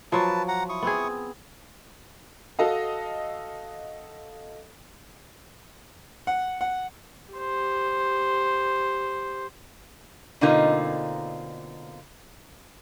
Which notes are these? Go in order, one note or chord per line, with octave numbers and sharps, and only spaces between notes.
F3 F#3 B4 A5
F#5 A#5
E4 C#6 D#6
B3 C4 G#4
F#4 A4 D#5 F5
F#5
F#5
G4 C5
B2 D3 A#3 C4 D#4 F4